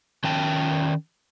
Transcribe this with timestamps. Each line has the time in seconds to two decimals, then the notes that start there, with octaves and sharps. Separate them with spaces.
0.24 D#3 C#4 G5 A5